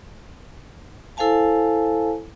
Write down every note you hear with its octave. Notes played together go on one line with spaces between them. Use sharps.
E4 A4 C5 F5 G#5 A5